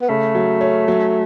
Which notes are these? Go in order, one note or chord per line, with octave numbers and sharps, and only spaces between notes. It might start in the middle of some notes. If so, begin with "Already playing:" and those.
B3
C#3 A3
F#3
C#4
F#3